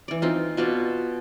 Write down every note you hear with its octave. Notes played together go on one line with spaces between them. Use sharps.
E3 D5
C4 D#4 F4
B2 F4 D5